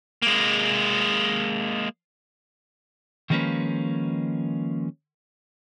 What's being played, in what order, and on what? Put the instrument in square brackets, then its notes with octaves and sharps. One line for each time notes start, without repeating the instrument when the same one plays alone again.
[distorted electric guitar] G#3 A#3
[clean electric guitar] D#3 F3 G#3 A#3 C#4 B4